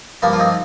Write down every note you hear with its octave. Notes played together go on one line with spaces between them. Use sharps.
G2 F3 A#3 D4
F4
C4 D#4